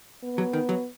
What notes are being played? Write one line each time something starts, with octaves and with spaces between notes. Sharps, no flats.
B3
F#3
D#3
F#3